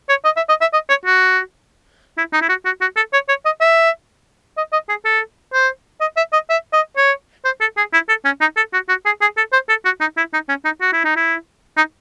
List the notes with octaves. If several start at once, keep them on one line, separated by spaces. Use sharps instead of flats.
C#5
D#5
E5
D#5
E5
D#5
C#5
F#4
E4
D#4
E4
F#4
F#4
F#4
A4
C#5
C#5
D#5
E5
D#5
D#5
G#4
A4
C5
D#5
E5
D#5
E5
D#5
C#5
C5
A4
G#4
E4
A4
C#4
D#4
A4
F#4
F#4
G#4
G#4
A4
C5
A4
F#4
D#4
E4
D#4
C#4
D#4
F#4
E4
D#4
E4
D#4